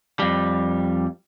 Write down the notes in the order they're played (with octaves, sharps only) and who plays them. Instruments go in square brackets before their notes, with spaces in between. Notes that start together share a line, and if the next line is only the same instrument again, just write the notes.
[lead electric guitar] F2 G3